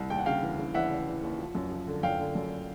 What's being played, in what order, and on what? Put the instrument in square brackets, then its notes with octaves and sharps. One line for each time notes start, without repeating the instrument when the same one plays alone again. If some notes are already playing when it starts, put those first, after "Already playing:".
Already playing: [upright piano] C2
D#2 G5
F#5
C#3 F5 G5
E3
C#3
E3 E5 F#5
C#3
E3
D#2
F3
F#2
F3
D3
F#2 F5 G5
D3
F#2